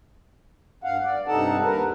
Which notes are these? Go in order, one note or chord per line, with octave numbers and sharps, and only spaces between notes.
G2 F5 F#5
D5
G2 C3 D#4 A4 F#5 A5
D#2 A#4 B4